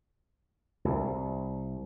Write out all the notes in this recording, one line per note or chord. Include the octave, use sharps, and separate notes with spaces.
C2